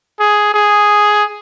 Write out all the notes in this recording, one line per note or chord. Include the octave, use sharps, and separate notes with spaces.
G#4
G#4